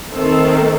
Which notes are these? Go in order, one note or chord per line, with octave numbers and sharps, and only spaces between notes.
D#3 A3 C4 A4